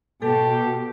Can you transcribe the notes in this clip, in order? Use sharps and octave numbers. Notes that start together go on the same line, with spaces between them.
B2 G4 A4 A5